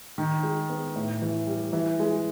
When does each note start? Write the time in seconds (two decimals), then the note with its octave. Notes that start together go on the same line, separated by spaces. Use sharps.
0.18 D#3
0.43 G#3
0.70 B3
0.96 A2
1.22 E3
1.47 G3
1.73 E3
2.00 G#3